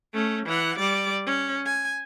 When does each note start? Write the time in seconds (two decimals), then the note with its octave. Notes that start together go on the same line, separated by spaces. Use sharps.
0.14 A3 C#4
0.46 E3 F#5
0.79 G3 D5
1.26 C#4
1.66 G#5